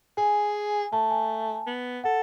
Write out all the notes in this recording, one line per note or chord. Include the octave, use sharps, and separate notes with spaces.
G#4 G#5
A3 A5
G#5
B3
A4 F#5